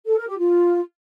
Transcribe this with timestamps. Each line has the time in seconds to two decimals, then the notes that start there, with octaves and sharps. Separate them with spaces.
0.07 A4
0.17 A#4
0.27 G4
0.37 F4